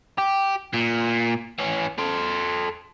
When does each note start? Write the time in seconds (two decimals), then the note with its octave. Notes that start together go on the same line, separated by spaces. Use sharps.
0.18 G4
0.74 A#2
1.59 E3 C#4
1.98 A4 C5